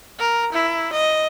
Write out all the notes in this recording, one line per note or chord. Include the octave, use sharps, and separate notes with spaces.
A#4
E4
D#5